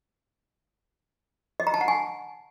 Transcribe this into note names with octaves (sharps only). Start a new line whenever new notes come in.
D#5
A#5
A5
F#5
G#5